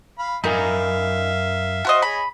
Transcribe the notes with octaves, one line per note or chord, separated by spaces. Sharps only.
F5 B5
F#2 D#4 A#4 E5 F5 G#5 B5
F#4 C5 D#5
G#4 C#5 D#5 B5